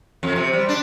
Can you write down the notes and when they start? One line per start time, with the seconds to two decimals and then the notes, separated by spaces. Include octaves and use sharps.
0.23 F2
0.36 C3
0.53 G3
0.69 D4